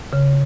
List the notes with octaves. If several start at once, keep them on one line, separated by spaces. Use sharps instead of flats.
C#3